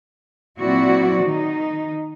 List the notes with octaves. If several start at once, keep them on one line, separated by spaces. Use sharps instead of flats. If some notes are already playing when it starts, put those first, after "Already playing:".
A#2 F#3 C4 E4 F#4 D5
D#3 D#4